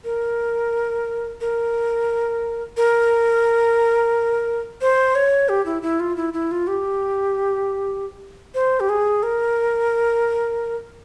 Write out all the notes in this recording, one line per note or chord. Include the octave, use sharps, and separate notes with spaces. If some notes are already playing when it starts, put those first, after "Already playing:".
A#4
A#4
A#4
C5
C#5
G4
E4
E4
F4
E4
E4
F4
G4
C5
G4
G#4
A#4